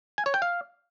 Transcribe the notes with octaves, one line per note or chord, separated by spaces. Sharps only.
G#5
C#5
G5
F5